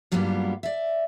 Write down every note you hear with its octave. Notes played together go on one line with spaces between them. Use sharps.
G2 F#3 G3 A#3 B3 F4
D5 E5